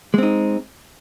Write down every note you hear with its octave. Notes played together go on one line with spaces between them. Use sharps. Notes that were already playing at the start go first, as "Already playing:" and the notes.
G#3 C4 D#4